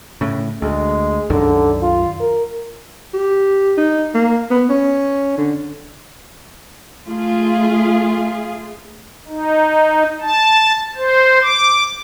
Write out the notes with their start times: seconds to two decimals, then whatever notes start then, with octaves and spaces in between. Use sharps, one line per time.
0.21 A2 C#3
0.62 D2 G#3
1.30 C2 F#2 D3 D#3
1.82 F4
2.20 A#4
3.14 G4
3.78 D#4
4.15 A#3
4.51 B3
4.70 C#4
5.38 D3
7.05 A3 F4 G#4
9.28 D#4
10.21 A5
10.97 C5
11.42 D6